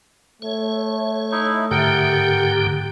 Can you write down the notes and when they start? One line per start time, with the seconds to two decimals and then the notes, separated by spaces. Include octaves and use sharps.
0.42 A3 C#5
1.32 D#4 E4
1.71 G#2 D3 G4 A#4 F#5 G5